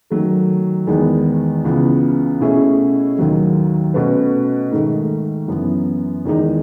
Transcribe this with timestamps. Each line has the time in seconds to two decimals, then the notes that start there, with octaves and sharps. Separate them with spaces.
0.10 D#3 F#3 A3
0.87 E2 D#3 G#3 B3
1.64 C#2 C#3 E3 B3
2.40 B2 A3 C#4 E4 G#4
3.17 D#2 D#3 F#3 A3
3.94 B2 A3 C#4 F#4 B4
4.71 G#2 D#3 A3
5.48 F#2 E3 B3
6.25 E2 D#3 G#3 D#4